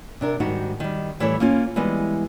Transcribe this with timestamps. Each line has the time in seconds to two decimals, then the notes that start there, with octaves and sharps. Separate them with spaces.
0.21 C3 D4 A#4
0.40 G#2 D#3 G3 D#4 F#4
0.80 D#3 G3
1.20 A2 E3 G3 E4 A4 C#5
1.40 A#3 C#4 F4
1.76 E3 G3 G#3 B3